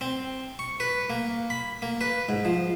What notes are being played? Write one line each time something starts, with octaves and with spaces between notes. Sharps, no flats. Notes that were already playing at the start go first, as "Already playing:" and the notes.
C4
C#6
B4
A#3
B5
A#3
B4
G#2
F3